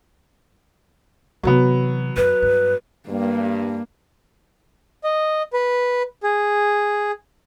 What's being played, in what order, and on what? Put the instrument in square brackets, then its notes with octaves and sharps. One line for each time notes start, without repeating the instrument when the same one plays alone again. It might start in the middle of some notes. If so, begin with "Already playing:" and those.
[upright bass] C3 E3 [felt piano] F#3 B3
[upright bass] F#2 [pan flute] B4
[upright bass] G2
[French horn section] G2 [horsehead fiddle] A#3
[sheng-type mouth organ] D#5
B4
G#4